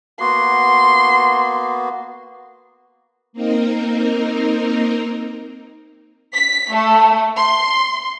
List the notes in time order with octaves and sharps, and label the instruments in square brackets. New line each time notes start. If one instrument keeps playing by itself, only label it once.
[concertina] A#3 B3 F#4 [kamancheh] C6
[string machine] A#3 C4 D#4 A#4
[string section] B6
A3
C6